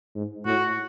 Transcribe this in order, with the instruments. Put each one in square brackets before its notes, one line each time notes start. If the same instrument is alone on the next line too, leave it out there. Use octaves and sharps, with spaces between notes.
[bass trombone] G#2
[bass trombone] A2 [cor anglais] F#4